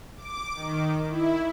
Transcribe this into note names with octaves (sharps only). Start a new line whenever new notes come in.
D6
D#3
E4